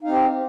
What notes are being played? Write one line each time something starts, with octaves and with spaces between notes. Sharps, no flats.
C4 D#4 G4 F5